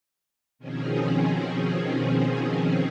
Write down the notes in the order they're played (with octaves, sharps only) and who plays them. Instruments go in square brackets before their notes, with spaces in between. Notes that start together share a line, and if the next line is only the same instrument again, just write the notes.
[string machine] B2 D#3 F3 C4 C#4 G#4